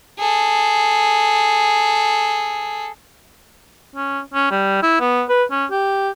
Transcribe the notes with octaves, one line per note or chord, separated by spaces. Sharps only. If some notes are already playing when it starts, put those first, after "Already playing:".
G#4 A4
C#4
C#4
G3
E4
B3
B4
C#4
G4